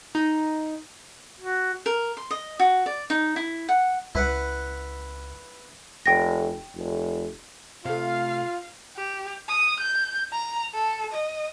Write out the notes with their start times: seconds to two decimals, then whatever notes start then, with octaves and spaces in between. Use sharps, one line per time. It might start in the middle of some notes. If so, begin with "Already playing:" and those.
0.15 D#4
1.40 F#4
1.86 A#4
2.17 C6
2.31 D#5
2.60 F#4
2.86 D5
3.10 D#4
3.36 E4
3.69 F#5
4.15 C#2 E4 B4 F#5
6.06 F1 G5 A#6
6.76 F1
7.85 C3 A3 F4 F5
8.96 G4
9.49 D#6
9.80 G6
10.32 A#5
10.74 A4
11.13 D#5